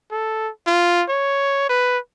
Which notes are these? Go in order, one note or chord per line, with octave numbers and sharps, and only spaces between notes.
A4
F4
C#5
B4